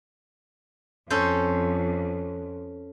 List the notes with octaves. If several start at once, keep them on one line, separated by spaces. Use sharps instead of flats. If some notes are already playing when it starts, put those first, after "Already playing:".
F2 C#4 A4 C5